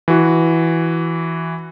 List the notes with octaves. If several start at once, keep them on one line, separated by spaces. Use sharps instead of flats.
E3 F#4